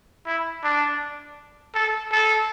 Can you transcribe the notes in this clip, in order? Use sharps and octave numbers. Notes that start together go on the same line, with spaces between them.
E4
D4
A4
A4